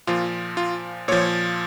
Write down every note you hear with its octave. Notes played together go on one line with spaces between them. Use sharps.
A#2 F3 F4
F4
A#2 F3 C#5